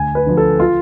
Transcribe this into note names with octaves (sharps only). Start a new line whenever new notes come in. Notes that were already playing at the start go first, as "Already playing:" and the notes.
Already playing: D2 G#5
B4
D3 F3
A4
F4